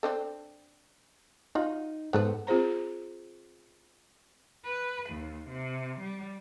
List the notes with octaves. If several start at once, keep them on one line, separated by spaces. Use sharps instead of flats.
C4 D4 A4
D#4 F4 F#4
G#2 B3 A4 B4 C5 F#5
C4 F4 G#4 C5 A#5
B4
D#2
C3
G3